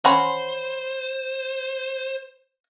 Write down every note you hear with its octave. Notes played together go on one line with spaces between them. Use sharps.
C#4 F#4 C5 B5 C6